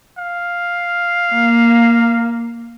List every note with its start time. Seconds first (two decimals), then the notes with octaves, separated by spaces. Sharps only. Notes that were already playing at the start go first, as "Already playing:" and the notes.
0.18 F5
1.33 A#3